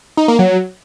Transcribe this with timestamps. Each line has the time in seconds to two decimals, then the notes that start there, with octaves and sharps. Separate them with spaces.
0.17 D#4
0.28 A#3
0.39 F#3